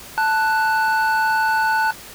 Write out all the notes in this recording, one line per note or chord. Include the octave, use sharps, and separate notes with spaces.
A5 F#6